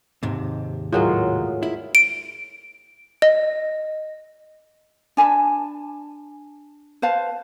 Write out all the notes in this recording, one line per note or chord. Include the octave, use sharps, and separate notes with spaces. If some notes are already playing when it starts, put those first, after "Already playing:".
D#2 G#2 C3
A2 F#3 G#3 F4 G#4 A#4
E4
D7
D#5
D4 G#5 A5 B5
B4 C5 F5 A5